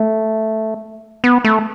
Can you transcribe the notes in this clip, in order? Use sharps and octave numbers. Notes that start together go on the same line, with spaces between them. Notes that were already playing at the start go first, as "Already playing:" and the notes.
Already playing: A3
B3
A3